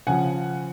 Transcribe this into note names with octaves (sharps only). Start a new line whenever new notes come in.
C#3 F3 F#5 G#5